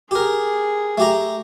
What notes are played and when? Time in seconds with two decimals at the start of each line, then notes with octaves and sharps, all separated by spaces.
0.11 G4 G#4 A#4
0.98 A3 G4 A#5